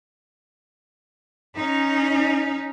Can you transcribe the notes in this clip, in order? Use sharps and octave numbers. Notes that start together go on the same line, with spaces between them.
C#4 D#4